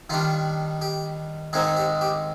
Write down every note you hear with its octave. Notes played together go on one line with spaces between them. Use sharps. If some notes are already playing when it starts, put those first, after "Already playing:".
D#3 G3 D4 F4
G4
G#2 D#3 G#3 C4 D#4 G#4
G4
G4